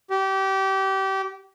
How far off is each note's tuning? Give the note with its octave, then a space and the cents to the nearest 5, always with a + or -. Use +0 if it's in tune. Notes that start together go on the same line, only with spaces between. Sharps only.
G4 -25